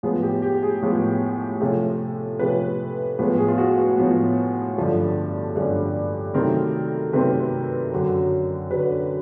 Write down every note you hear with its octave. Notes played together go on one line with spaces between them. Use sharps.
A2 F3 G#3 B3 G#4
G4
G4
G#4
A2 F3 G#3 B3
C3 F3 A3 C#4
C3 F3 A3 C#4 B4
A2 F3 G#3 B3 B4
G#4
F4
F#4
F#4
A2 F3 G#3 B3
G2 D3 F3 A3 C#4
G2 D3 F3 A3 C#4
C3 D#3 F#3 A3 C4 A#4
C3 D#3 F#3 A3 C4 B4
F#2 D3 F#3
F#2 D3 F#3 B4